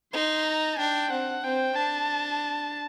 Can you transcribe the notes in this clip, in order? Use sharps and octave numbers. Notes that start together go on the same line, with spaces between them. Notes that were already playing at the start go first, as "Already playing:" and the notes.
D#4 C6
A#5
D4 G5
C4 F#5
C4 G5
D4 A5